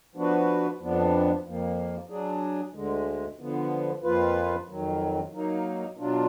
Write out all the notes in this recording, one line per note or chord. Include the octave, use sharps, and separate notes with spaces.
F3 B3 D4 F#4 B4
F2 F3 B3 D4
F2 F3 A#3
F#3 D4 G#4
D2 D3 G#3
D3 F3 B3
F2 F3 A#3 F4 B4
F2 D#3 F#3
F#3 A#3 D#4
B2 F#3 D4 F4